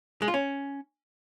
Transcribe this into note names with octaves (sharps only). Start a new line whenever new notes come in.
G#3
F4
C#4